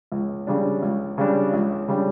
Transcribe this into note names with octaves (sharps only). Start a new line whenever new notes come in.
C#2
C#3 G3 D4
C#2
C#3 G3 D4
C#2
C#3 G3 D4